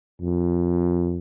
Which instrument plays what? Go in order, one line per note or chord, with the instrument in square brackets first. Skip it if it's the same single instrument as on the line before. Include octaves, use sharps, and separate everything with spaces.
[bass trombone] F2